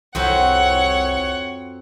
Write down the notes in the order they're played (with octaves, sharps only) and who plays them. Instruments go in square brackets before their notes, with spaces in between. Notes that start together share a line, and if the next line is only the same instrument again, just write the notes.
[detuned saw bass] C2 [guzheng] F2 C4 F#4 [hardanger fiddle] C#5 F#5